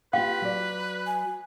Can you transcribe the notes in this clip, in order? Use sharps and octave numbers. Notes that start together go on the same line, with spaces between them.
F4 G4 B4 F5 G5
F#3 D5
G#5